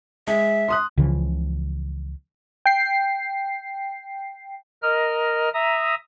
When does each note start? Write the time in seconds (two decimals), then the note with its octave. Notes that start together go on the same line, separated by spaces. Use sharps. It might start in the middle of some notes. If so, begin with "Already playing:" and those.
0.27 G#3 E5
0.68 C6 D#6 F#6
0.98 C#2 C#3 E3 F3
2.66 G5 C7
4.83 A#4 D#5 F6
5.54 E5 A#5 D#6